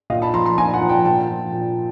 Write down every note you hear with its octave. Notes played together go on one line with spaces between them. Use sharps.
A#2 D#5 F5
A5 B5
F3 A#5 C6
A#5 C6
A#2 G#5 A#5
F#5 G#5
F3
G5 A5
A#2 G5 A5
F3
A#2